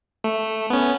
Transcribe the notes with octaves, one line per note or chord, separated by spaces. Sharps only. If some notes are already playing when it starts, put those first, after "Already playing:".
A3
B3 C#4